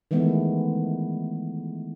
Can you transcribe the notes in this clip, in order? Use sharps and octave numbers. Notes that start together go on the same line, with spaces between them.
D#3 E3 G#3 A3 B3